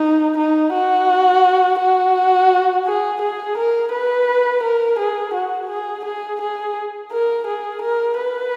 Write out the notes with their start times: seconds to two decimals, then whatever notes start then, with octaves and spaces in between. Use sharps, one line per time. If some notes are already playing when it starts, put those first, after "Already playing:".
Already playing: D#4
0.38 D#4
0.73 F#4
1.80 F#4
2.86 G#4
3.21 G#4
3.57 A#4
3.93 B4
4.63 A#4
4.99 G#4
5.34 F#4
5.69 G#4
6.05 G#4
6.41 G#4
7.12 A#4
7.47 G#4
7.82 A#4
8.18 B4